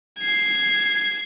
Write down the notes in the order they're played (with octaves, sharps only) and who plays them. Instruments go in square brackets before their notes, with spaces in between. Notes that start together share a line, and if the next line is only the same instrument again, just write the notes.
[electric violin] G#6 C7